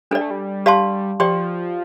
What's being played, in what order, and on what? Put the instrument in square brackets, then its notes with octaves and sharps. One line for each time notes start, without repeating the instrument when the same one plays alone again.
[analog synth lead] G3 [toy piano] D4 A4 D5
[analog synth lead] A3
G3
[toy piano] G4 D5 F5 A5 C6
[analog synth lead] F3 [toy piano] G4 D5 G5 C6